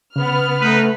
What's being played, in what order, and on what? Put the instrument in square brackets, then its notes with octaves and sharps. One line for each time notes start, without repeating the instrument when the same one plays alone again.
[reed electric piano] C#3 [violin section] B3 F6
[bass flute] A3 [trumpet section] D#4 B4